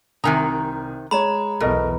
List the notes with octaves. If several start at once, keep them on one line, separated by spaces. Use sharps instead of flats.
C2 C3 D#3 G#5 A#5 D#6
G#3 C#5 A#5 B5
B1 E2 B2 A4 A#4 D#5